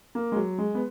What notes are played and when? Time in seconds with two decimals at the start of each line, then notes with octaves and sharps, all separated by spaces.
0.15 A#3
0.32 G#3
0.36 F#3
0.58 G#3
0.75 B3